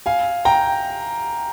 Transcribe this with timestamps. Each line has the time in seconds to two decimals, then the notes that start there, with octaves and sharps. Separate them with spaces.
0.06 F5 G#5
0.45 G5 A#5